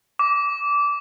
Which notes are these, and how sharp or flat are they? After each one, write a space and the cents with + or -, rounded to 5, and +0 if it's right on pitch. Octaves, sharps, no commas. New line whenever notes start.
D6 -20